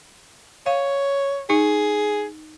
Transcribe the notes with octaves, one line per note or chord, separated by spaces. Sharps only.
C#5 F5
D#4 G#4